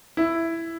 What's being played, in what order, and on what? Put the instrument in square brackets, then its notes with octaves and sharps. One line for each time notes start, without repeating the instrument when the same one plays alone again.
[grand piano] E4